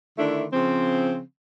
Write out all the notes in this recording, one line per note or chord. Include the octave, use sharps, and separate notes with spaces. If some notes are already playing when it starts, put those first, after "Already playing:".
D3 D#3 A3 D4 E4
C#3 F3 C4